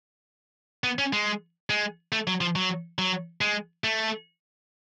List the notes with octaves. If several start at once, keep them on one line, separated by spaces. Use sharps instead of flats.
B3
C#4
G#3
G#3
A3
F#3
F3
F#3
F#3
G#3
A3